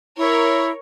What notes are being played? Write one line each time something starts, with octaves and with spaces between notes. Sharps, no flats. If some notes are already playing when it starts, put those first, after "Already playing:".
E4 A#4 C#5